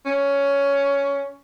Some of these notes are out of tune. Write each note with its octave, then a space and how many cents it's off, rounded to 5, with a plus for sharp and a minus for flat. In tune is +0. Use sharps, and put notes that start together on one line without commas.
C#4 +10